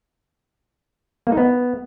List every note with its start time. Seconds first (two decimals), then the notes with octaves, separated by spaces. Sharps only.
1.27 A#3
1.32 D#4
1.37 B3